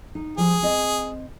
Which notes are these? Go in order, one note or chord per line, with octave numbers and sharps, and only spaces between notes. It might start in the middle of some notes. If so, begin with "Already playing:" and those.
D#4
F3 G3 G#4 C5
C4 C5 D#5